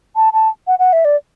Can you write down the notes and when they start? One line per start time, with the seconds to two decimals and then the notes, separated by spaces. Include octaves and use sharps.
0.16 A5
0.33 A5
0.67 F#5
0.79 F#5
0.93 E5
1.05 D5